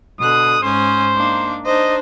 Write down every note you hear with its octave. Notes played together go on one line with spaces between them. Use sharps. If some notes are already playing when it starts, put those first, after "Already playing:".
B2 D3 D#6 F#6
G#2 C#4 C5 D#6
A#3 D4 D#4
D4 D#4 C5 D#5